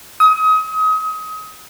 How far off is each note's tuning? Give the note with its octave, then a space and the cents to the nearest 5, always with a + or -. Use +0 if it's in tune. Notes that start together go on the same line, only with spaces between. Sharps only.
D#6 +30